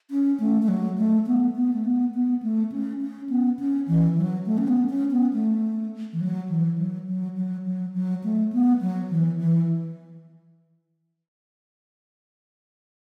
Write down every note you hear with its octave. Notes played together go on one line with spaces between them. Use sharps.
C#4
A3
A3
F#3
A3
B3
B3
A3
B3
B3
A3
C#4
C#4
B3
C#4
E3
F#3
A3
C#4
B3
C#4
B3
A3
E3
F#3
E3
F#3
F#3
F#3
F#3
F#3
A3
B3
F#3
E3
E3